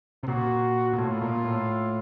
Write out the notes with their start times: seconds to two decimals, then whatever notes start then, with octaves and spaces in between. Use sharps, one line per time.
0.23 C3
0.28 A#2 F#4
0.93 A#2
0.98 A2 F4
1.21 A#2
1.45 A2